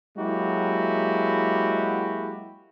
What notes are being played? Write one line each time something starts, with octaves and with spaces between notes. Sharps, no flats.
F#3 G#3 A#3 E4 F#4 G4